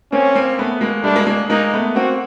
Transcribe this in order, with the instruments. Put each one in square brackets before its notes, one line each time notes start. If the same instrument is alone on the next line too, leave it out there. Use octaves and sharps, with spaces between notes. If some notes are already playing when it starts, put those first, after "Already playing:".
[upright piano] A#3 C4 [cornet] C#4
[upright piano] A#3 C4
A3 B3
G#3 A#3
[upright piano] G3 A3 [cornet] D4
[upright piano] G#3 A#3
G#3 A#3
[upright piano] G#3 A#3 [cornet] D#4
[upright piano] A3 B3
[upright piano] A#3 C4 [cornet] F#4